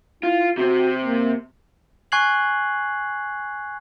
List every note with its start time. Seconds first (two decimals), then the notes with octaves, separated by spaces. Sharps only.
0.23 E4 F4
0.57 C3 C4 F#4
1.05 A#3
2.12 G#5 C#6 F#6 G#6 C7 F#7